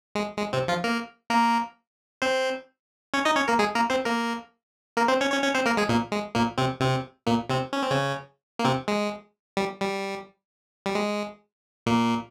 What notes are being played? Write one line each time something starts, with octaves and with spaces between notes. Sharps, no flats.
G#3
G#3
C3 C4
F3 F4
A#3 A#4
A#3 A#4
C4 C5
C#4 C#5
D#4 D#5
C#4 C#5
A#3 A#4
G#3 G#4
A#3 A#4
C4 C5
A#3 A#4
A#3 A#4
C4 C5
C#4 C#5
C#4 C#5
C#4 C#5
C4 C5
A#3 A#4
G#3 G#4
A#2 A#3
G#3
A#2 A#3
C3 C4
C3 C4
A#2 A#3
C3 C4
C#4
C4
C#3 C#4
A#3
C3 C4
G#3
G3
G3
G3
G#3
A#2 A#3